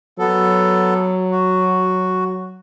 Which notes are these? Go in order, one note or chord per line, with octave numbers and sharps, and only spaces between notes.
F#3 B3 A4
F#4